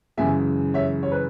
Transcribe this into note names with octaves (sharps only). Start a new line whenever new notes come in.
F#2 C#3 E3 G#3 E5 G#5
C#5 E5
C#5
B4